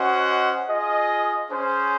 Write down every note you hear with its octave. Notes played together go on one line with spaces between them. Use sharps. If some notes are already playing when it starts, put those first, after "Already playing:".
Already playing: C#4 F#4 C5 D#5 F#5
F4 G#4 D#5
C#4 G#4 C5